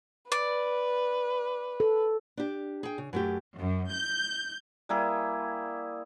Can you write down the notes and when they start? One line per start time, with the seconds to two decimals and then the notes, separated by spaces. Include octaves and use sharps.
0.32 B4 D5
1.80 A4
2.37 D4 G4
2.83 G#4 G5
2.98 C#3
3.13 F#2 A3 G4
3.57 F#2
3.91 G6
4.89 G3 A#3 E4 G#4